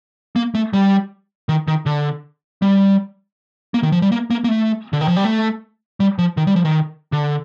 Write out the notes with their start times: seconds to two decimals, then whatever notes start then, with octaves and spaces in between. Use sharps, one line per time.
0.36 A#3
0.55 A3
0.73 G3
1.49 D#3
1.68 D#3
1.86 D3
2.62 G3
3.74 A#3
3.83 D#3
3.92 F3
4.02 G3
4.12 A#3
4.30 A#3
4.44 A#3
4.49 A3
4.93 D3
5.01 D#3
5.08 F3
5.17 G3
5.25 A3
6.00 G3
6.18 F3
6.37 D#3
6.47 G3
6.56 F3
6.65 D#3
7.12 D3